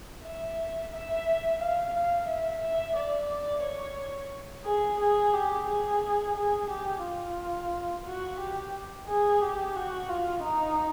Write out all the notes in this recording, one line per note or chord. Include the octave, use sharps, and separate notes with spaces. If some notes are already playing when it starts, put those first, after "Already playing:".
E5
E5
F5
F5
E5
E5
D5
D5
C#5
G#4
G#4
G4
G#4
G#4
G4
F4
F#4
G4
G#4
G4
F#4
F4
D#4